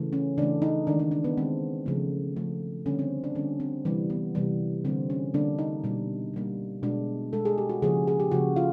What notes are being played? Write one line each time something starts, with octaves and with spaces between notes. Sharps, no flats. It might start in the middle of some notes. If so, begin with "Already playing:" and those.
Already playing: C#3 E3 A3
C#4
C#3 E3 A3 D4
D#4
D#3 G#3 D4
D4
D4
B3
D#3 G#3 C4
C#3 F3 A3
C#3 F3 A3
D3 G3 A#3 C#4
C4
D4
D3 G3 A#3 C#4
C4
C3 E3 G3 A#3
B3
C3 E3 G3
D3 G3 A#3 C4
C#4
D3 G3 A#3 D4
D#4
B2 G3 A#3
B2 G3 A#3
B2 G#3 D4
B2 G#3 A4
G#4
G4
F#4
C#3 F3 A#3 G#4
G#4
G4
C#3 F3 A#3 F#4
F4